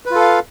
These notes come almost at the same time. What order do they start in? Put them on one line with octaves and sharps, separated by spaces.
B4 F4 A4 F5